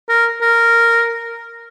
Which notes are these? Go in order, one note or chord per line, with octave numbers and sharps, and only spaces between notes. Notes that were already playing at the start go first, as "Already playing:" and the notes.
A#4
A#4